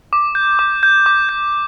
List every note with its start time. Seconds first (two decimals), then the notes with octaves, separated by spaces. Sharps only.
0.13 D6
0.35 G6
0.59 D6
0.83 G6
1.06 D6
1.29 G6